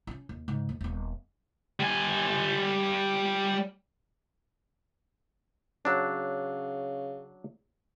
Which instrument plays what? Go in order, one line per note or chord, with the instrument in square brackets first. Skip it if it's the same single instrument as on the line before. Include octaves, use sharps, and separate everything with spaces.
[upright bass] C#4 E4
D#2
G#2 C#3
D#2
D#1 B3
[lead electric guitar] G3 G#5
[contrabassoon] C#3 [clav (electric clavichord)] F#3 D4